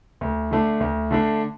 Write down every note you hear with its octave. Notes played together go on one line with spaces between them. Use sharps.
D2
D3 A3 D4
D2
D3 A3 D4